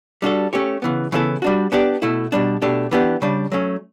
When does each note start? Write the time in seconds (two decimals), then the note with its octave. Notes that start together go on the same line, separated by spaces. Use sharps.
0.22 G3 D4 F#4 A4
0.53 A3 C#4 G4 C#5
0.82 C#3 E3 B3
1.12 C#3 E3 B3 E4 A4
1.42 G3 D4 F#4
1.72 B3 D4 G4 D5
2.02 B2 A3 E4
2.32 B2 G3 D4
2.62 B2 A3 D4 G4
2.91 E3 B3 D4 G4
3.22 C#3 G3 D4
3.52 F#3 A3 C#4